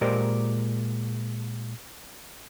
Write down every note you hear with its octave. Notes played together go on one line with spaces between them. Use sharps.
A#2 G#3 G4 A#4 C5 D5